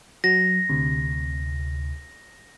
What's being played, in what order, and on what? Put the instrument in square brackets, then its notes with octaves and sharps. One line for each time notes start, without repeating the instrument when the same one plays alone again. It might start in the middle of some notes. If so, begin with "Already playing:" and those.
[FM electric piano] F#3 [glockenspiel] A#6
[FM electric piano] D2 C3